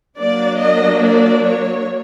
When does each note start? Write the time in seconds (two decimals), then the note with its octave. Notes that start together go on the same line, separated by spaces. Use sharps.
0.19 F#3 A#3 D4 D5
0.61 D#5
1.02 D5
1.45 C#5